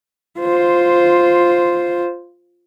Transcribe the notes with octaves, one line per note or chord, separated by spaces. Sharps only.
F4 C5